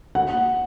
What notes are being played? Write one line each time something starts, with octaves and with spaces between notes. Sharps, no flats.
F#5